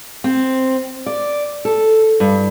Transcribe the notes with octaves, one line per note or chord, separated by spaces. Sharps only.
C4
D5
A4
G2